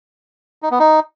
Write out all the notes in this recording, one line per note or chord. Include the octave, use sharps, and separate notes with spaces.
D#4
B3
D#4